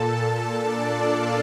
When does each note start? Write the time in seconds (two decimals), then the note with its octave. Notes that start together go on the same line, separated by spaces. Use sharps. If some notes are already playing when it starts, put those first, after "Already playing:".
Already playing: A#2 A4 A5
0.58 D4 D5
1.11 F4 F5